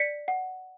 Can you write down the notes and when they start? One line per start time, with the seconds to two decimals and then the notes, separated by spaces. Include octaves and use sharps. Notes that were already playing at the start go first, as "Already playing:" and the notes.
Already playing: D5 B6 C#7
0.28 F#5